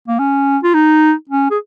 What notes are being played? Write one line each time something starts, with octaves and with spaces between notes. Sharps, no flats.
A#3
C#4
F4
D#4
C#4
G#4